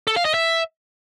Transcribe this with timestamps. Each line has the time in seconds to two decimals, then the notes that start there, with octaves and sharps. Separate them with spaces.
0.07 A4
0.16 F5
0.25 D#5
0.34 E5